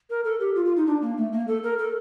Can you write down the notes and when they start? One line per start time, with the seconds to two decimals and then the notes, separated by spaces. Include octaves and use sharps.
0.10 A#4
0.25 A4
0.40 G4
0.55 F4
0.65 F4
0.76 D#4
0.87 D4
1.02 A#3
1.17 A3
1.32 A#3
1.48 A4
1.63 A#4
1.78 A4